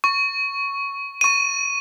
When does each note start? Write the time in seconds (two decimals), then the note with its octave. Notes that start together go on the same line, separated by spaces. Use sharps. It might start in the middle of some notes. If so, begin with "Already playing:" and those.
0.04 C#6
1.21 C#6 D#7